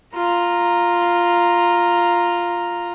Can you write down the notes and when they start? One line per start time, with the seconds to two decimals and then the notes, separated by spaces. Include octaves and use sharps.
0.14 F4 A#5